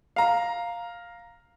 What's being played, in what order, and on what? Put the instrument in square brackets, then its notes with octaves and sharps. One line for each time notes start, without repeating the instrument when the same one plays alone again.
[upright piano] F5 A#5